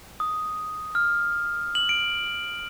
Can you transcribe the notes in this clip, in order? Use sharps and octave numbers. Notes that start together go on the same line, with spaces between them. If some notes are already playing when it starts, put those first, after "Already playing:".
D#6
F6
F#7
D7